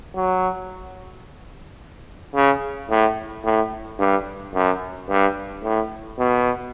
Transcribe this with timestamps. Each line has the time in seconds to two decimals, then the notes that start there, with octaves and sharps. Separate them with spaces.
0.16 F#3
2.35 C#3
2.90 A2
3.44 A2
3.99 G2
4.55 F#2
5.10 G2
5.64 A2
6.19 B2